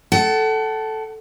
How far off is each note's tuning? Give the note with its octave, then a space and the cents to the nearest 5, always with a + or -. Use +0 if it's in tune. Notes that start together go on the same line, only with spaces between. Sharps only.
A4 -5 F#5 +35